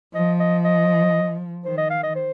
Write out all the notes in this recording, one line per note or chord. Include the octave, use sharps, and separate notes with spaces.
F3 D#5
D#5
D#5
D#3 C5
D#5
F5
D#5
C5